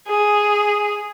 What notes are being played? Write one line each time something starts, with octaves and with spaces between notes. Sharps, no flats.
G#4